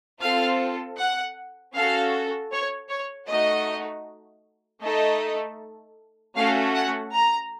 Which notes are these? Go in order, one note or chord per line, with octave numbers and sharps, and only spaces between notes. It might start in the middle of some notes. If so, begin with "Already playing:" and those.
C4 F4 A4 F5
F#5
C#4 F#4 A4 F5
C#5
C#5
A3 D#4 F#4 D#5
A3 D#4 A4 D#5
A3 C#4 F#4 A4 F5
F#5
A#5